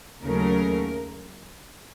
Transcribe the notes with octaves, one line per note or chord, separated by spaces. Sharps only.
D#2 C#3 F#3 A3 A#4